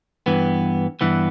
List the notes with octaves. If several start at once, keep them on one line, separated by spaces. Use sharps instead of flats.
G2 E3 B3
G2 E3 B3